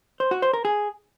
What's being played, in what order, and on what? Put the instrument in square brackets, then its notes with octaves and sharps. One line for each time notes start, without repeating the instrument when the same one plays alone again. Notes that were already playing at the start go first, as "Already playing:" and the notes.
[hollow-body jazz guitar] C5
F#4
C5
A#4
G#4